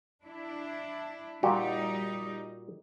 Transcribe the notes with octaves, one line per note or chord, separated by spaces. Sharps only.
D4 E4
A#2 G3 D#4 F#4 G4